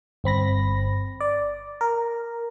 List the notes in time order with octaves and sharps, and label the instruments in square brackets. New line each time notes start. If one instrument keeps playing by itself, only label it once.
[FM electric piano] G1 C4 B5 A#6
D5
A#4